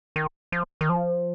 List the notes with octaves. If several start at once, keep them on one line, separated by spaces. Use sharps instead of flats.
D#3
F3
D#3
F3